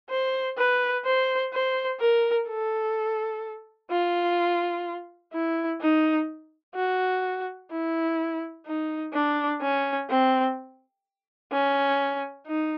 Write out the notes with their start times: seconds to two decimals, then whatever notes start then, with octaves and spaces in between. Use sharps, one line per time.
0.10 C5
0.58 B4
1.05 C5
1.53 C5
2.00 A#4
2.48 A4
3.91 F4
5.34 E4
5.81 D#4
6.76 F#4
7.71 E4
8.66 D#4
9.14 D4
9.62 C#4
10.10 C4
11.52 C#4
12.47 D#4